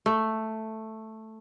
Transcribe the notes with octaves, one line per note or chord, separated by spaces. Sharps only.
A3